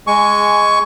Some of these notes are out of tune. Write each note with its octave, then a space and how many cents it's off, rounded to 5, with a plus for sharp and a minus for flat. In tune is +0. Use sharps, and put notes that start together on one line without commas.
G#3 +0 G#5 +5 C#6 +15